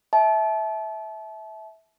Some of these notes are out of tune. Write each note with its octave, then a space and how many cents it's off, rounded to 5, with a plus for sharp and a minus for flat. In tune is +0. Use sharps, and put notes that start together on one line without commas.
E5 -15 A5 -30